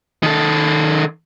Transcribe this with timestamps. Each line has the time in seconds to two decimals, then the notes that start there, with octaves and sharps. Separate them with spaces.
0.23 D#3 A4